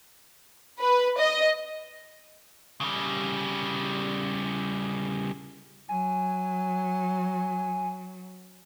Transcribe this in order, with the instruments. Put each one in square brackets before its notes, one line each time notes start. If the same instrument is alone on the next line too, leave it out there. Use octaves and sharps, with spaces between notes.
[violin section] B4
D#5
[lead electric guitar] C#3 G3
[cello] F#3 [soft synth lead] G#5